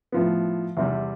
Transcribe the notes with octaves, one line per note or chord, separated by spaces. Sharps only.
A2 F3 B3
E2 C3 G3